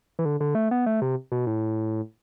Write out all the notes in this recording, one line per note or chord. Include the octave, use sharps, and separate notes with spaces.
E3
D3
D3
A3
B3
A3
C3
B2
A2